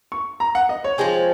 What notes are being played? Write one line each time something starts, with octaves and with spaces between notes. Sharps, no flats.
C#6
A#5
F#5
D#5
C#5
F3 G#3 C4